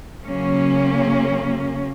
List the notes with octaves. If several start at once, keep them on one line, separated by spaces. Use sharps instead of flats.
C#3 F#3 A#3 C#4